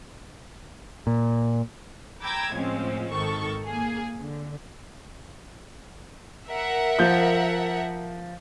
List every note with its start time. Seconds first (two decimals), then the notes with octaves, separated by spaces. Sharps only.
1.07 A#2
2.20 G5 A#5 B5 D6 E6 G#6
2.53 A2 F3 G#3 C4 C#4
3.11 G#1 D#3 A4 C#6
3.65 A#3 G#4
4.18 D3
6.47 A#4 E5 F#5
6.99 F3 G6